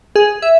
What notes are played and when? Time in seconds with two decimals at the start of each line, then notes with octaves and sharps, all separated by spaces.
0.16 G#4
0.42 E5